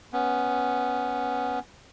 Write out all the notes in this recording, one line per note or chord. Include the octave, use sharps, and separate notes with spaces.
B3 C#4